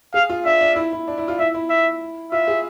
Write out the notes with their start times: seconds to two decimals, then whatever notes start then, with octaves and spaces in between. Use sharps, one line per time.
0.14 G#4 F5
0.30 F4
0.45 D4 E5
0.61 D4
0.76 E4
0.92 E4
1.08 D4
1.18 E4
1.28 F4
1.39 E4 E5
1.54 E4
1.70 E5
2.32 F4 E5
2.48 G#4